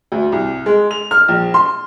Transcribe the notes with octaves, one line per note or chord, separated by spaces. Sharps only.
D2
C2
G#3
F7
F6
A#1
C6